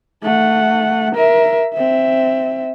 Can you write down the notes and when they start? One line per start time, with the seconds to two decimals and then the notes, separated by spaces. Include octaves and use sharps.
0.23 A3 F#5
1.15 A#4 E5
1.74 C4 E5